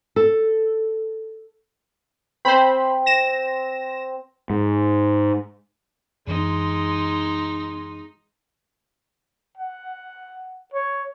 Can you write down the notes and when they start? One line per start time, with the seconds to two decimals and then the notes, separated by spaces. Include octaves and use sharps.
0.16 A4
2.45 C4 C5 B5
3.06 A#6 E7
4.50 G#2
6.27 F#2 E3 G#3 D#4 C6
9.57 F#5
10.74 C#5